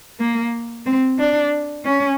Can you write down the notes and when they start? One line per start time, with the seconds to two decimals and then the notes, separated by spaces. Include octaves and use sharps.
0.20 A#3
0.86 C4
1.19 D4
1.85 C#4